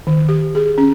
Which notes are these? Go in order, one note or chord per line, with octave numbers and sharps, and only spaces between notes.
D#3
G4
G#4
C#4